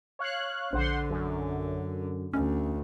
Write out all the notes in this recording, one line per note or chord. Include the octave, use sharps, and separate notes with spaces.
C#5 F5 F#6
A#1 D3 C5 F#5 C6
F#2
D2 C#4